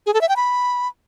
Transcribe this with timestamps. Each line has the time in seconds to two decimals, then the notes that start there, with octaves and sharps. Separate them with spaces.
0.06 G#4
0.14 A4
0.21 E5
0.29 G5
0.36 B5